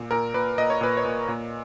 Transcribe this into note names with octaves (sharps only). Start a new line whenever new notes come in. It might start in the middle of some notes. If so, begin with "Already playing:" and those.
Already playing: A#2
A#2 A#4
A#2 B4
A#2 D#5
C#5
A#2 B4
C#5
A#2
A#2